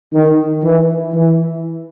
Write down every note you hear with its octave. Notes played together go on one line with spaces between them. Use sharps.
D#3
E3
E3